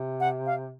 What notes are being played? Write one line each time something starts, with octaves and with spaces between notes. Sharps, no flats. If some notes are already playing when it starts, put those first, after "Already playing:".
Already playing: C3
F#5
F5